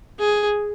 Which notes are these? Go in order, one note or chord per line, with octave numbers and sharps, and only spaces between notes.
G#4